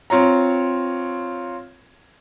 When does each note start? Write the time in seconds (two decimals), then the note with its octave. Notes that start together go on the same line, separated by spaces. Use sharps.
0.10 C4 F4 C#5 A#5